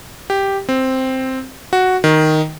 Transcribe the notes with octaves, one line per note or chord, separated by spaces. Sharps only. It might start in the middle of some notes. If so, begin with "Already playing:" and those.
G4
C4
F#4
D#3